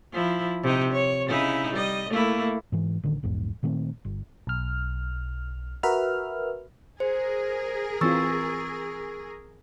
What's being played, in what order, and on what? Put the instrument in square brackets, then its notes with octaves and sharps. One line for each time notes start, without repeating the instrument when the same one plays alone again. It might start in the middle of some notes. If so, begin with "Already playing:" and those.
[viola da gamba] F3 E4
C3 D#4
C#5
C#3 D#4 E4
G3 D#5
A3 A#3 E4
[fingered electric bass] G#2 E3
A1 D3 D#3
A#1 E2 G#2
A#2 D#3 A3 C4
G1
[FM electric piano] B1 F6
F#4 A#4 B4 E5 F6
[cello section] G#4 A#4 [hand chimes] C5
[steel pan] E3 C4 F4 [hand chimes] C#6 E6 A6